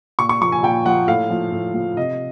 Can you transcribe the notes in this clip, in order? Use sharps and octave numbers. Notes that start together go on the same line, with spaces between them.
A#2 C#6
C#6
F3 C#6
G#5
A#2 G5
F3 F#5
A2 F5
F3
A2
F3
C3 D#5